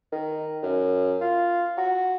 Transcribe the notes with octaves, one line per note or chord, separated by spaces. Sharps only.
D#3
F#2
F4
F#4